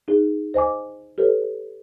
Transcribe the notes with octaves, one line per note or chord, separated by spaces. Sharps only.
D#4 G#4
C5 D#5 G#5 D6
G4 A4 B4 C#5